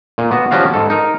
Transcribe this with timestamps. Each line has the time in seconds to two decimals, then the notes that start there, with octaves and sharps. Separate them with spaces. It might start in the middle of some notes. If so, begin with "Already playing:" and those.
0.18 A#2
0.31 B3 F#4
0.51 F3 G3 C#4 F#4 F5
0.74 G#2 A4
0.90 D#4 A#4